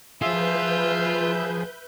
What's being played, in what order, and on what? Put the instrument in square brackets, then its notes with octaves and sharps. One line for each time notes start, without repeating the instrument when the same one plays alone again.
[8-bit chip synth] F3 G#4 [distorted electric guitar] F4 [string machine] B4 G6 [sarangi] E5